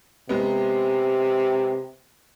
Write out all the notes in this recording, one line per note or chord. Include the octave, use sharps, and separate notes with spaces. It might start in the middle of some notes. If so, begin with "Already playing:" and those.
C3 G#3 B3